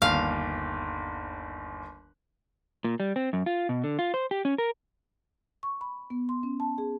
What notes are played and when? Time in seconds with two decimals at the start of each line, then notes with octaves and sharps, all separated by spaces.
0.02 G1 D#2 F5
2.84 A#2
3.00 G3
3.16 C4
3.33 F#2
3.46 F4
3.69 B2
3.84 D3
3.99 F4
4.14 C5
4.31 G4
4.45 C#4
4.58 A#4
5.63 C#6
5.81 B5
6.10 B3
6.29 C6
6.43 C#4
6.60 A5
6.78 G#4